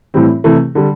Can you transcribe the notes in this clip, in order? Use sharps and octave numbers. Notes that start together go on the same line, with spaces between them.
A2 E3 G3 C4
C3 E3 A3
D3 G3